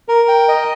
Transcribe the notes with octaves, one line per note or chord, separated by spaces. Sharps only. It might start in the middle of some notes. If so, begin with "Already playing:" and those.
A#4
G5
D#5